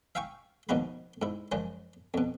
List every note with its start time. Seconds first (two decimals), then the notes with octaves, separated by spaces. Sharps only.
0.15 E5 F5 G5 G#5 C#6
0.69 D#2 B2 F3 D#4 F#4 B5
1.22 G#2 E4
1.52 F#2 C#3 F3 G#3
2.14 F2 B2